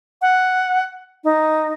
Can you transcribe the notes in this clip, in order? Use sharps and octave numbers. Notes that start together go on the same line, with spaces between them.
F#5
D#4